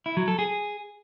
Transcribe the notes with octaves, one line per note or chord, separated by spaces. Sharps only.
E4
F#3
A4
G#4